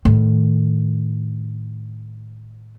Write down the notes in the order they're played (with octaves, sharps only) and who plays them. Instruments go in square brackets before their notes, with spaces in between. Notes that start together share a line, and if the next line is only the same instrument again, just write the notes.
[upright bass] A2 D#3